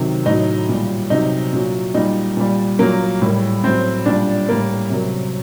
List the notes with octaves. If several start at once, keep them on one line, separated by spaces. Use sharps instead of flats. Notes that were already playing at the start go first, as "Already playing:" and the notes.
Already playing: C3 D#3 F#3
A2 F#3 D#4
A#2 G3
C3 F#3 D#4
A#2 F#3
A#2 G3 D#4
A#2 G3
A#2 F#3 A#3
A2 G3
A2 F#3 C4
A#2 G3 D4
A2 G3 A#3
C3 F#3